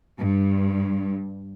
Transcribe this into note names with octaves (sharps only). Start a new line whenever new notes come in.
G2